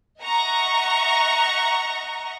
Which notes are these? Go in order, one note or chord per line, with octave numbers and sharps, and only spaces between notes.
D#5 E5 F#5 A#5 C#6